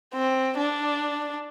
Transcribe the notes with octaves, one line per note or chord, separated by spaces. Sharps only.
C4
D4